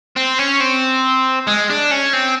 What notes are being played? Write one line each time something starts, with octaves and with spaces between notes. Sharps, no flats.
C4
C#4
C4
G#3
D4
C#4
C4